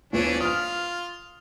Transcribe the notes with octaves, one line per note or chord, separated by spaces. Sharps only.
D#1 E3 B3 C#4 D4
F4 D#6 F6